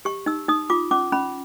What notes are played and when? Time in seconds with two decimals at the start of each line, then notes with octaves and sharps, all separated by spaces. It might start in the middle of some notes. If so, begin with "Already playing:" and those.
0.05 G4 C#6
0.26 D#4 E6
0.48 D#4 D#6
0.70 F4 D6
0.91 C#4 D6
1.12 C#4 B5